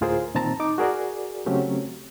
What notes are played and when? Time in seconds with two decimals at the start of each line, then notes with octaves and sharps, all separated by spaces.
0.01 D2 A2 F4 G#4 A#4 C5
0.35 A#2 D#3 C4 A5 A#5
0.60 D#4 D6
0.78 F#4 G#4 A#4 D5
1.46 C#3 F#3 A3 C4 C#4 G4